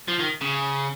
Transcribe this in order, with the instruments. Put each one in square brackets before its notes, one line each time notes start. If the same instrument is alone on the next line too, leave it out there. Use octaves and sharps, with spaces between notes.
[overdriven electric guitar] F3
D#3
C#3